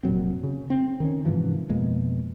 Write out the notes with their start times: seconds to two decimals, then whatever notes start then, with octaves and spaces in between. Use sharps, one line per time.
0.03 F1 A#2 F#3 C4
0.43 C#3
0.70 C4
1.00 D#3 C4 C#4
1.25 G#2 C3 E3 F3
1.69 F2 B2 G#3 A#3